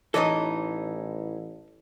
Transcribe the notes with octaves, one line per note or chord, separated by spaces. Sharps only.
A1 E3 D#4 A4 C#5 D#5